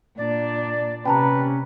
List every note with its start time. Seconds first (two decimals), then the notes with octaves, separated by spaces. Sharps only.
0.18 A#2 D4 D5
1.05 C3 C#4 B4 G5 A5 A#5